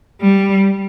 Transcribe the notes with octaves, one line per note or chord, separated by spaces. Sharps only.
G3